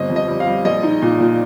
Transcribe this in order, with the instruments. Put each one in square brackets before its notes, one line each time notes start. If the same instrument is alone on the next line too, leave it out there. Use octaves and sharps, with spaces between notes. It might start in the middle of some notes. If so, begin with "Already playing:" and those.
Already playing: [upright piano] G1 C4 D#5
F2
D#5
G3
F5
G3
A#1 D#5
D#4
A#2
A#2